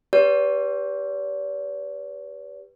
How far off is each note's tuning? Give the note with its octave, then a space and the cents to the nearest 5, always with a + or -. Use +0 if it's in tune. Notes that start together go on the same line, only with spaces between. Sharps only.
G4 +0 B4 +0 D5 -45